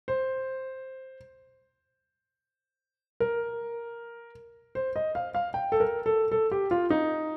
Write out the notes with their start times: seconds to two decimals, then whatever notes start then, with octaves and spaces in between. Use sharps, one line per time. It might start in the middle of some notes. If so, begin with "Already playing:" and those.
0.08 C5
3.20 A#4
4.75 C5
4.96 D#5
5.15 F5
5.35 F5
5.54 G5
5.72 A4
5.80 A#4
6.06 A4
6.32 A4
6.52 G4
6.71 F4
6.90 D#4